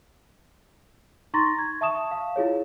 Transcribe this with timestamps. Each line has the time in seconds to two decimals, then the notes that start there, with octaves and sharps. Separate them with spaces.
1.34 D#4 A#5 C6 C#6 A6 A#6
1.59 G#6
1.81 E5 A5 C#6 D#6 E7
2.11 F5
2.36 E4 F4 G#4 C#5